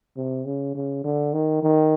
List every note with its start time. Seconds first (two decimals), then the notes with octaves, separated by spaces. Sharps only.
0.17 C3
0.45 C#3
0.75 C#3
1.04 D3
1.33 D#3
1.63 D#3